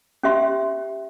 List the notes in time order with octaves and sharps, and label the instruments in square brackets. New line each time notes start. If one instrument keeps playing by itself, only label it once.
[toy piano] C#4 G4 E5 C6